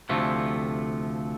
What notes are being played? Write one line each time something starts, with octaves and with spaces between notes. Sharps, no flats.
D2 C3 F3 A3